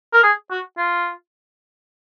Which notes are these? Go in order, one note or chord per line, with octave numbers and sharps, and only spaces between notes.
A#4
G#4
F#4
F4